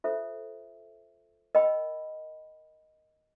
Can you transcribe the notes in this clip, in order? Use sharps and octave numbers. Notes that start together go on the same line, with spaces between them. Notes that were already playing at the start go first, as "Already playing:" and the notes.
F4 A4 C5 E5
A#4 D#5 G5 B5